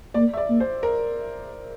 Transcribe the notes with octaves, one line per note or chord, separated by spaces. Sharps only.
A#3 D5
E5
D5
A#3
C5
A#4